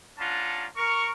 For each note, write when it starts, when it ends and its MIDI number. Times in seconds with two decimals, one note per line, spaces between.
0.18 0.66 61
0.18 0.66 62
0.18 0.66 65
0.18 0.66 78
0.18 0.66 81
0.18 0.66 82
0.77 1.10 70
0.77 1.10 85